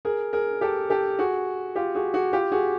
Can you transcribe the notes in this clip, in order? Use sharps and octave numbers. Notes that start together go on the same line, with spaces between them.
G#4 A#4
G#4 A#4
G4 A4
G4 A4
F#4 G#4
F4 G4
F#4 G#4
F#4 G#4
F4 G4
F#4 G#4